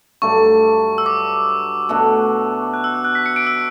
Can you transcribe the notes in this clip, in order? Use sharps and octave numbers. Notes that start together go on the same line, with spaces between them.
G2 D3 F#3 A3 C#6
E6
D6
B2 A3 D4 F#4 D6
F#6
E6
F#6
F#6
B6
C#7
D7
E6